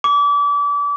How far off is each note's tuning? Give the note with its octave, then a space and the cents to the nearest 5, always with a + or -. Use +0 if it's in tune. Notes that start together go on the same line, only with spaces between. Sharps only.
D6 -35